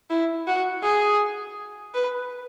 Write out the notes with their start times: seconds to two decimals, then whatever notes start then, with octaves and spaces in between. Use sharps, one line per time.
0.10 E4
0.47 F#4
0.83 G#4
1.94 B4